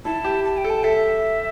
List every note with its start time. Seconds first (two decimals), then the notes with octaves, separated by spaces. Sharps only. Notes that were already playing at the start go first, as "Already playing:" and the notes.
0.05 E4 A5
0.24 G4
0.45 A5
0.57 G5
0.64 A4
0.70 A5
0.84 A4 E5